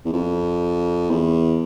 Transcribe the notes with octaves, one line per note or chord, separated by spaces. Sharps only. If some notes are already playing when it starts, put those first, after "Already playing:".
E2
F2
E2